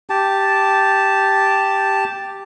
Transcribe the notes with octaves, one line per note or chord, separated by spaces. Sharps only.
G4 A5